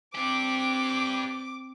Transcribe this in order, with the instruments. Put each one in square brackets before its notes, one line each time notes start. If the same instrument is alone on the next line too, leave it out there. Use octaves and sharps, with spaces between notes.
[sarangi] C4 [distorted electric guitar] D4 G4 [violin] D6